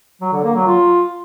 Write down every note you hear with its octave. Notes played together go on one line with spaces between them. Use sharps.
F#3
D3
A#3
F#3
F4